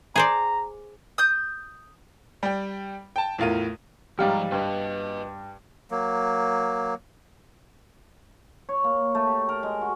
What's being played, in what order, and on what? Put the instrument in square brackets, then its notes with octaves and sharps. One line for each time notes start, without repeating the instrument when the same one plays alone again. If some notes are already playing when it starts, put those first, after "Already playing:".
[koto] G#4 C5 D5 [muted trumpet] A#5
[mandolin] D#6 G6
[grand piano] G3 G5
G5 A5
E2 A2 F4 A#4 D#7
[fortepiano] G#2 G3 F6 [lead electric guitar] F3 A#5 [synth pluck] G4 F5 G5
[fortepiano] G2 [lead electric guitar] B4 D#5
[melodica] F#3 A#3
[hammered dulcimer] C#5
A#3
A3
G4
A#4
G#3
F#4